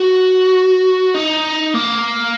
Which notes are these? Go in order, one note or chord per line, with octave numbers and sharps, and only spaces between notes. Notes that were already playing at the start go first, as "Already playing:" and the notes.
Already playing: F#4
D#4
A#3